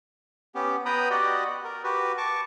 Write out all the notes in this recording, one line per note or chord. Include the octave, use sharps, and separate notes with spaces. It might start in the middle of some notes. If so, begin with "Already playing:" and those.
B3 C#4 G4
B3 B4 G5 A#5 B5 D#6
F#4 G4 D5 D#5 F#5
A#4
F#4 G4 B4
A5 C#6 D6